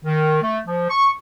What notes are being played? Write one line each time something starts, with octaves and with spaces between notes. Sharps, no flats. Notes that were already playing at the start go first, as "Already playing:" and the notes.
D#3
A3
F3
C#6